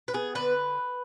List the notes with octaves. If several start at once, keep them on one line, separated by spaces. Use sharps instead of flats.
B4
B3 G#4
D3 B4